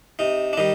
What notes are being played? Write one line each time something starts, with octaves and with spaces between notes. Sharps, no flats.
C3 D#4
D4
D#3 G3 D#4